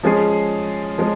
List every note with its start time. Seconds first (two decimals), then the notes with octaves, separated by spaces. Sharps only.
0.03 F3 G#3 C#4 G#4
0.98 F3 G#3